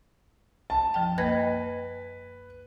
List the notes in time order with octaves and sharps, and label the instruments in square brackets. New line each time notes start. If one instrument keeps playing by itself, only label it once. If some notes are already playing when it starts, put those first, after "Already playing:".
[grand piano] A5
[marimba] F#2 F3 G5
[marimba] A#3 D#5 G#6 [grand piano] B4